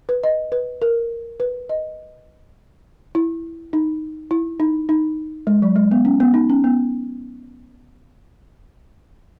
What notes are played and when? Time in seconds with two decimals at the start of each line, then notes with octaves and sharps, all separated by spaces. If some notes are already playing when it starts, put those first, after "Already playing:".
0.09 B4
0.24 D#5
0.52 B4
0.82 A#4
1.40 B4
1.69 D#5
3.15 E4
3.73 D#4
4.31 E4
4.60 D#4
4.89 D#4
5.47 G#3
5.62 F#3
5.76 G#3
5.91 B3
6.05 C#4
6.20 B3
6.34 D#4
6.50 C#4
6.64 B3